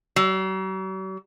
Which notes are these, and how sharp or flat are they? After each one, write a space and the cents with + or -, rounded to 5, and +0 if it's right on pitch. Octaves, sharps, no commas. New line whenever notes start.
F#3 +45